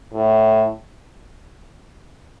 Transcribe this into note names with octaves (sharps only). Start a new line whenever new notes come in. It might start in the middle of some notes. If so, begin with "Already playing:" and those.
A2